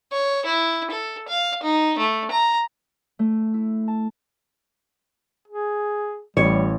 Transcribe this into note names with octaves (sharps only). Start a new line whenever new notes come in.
C#5
E4
A4
F5
D#4
A3
A#5
A3
E4
A5
G#4
A1 G3 C#5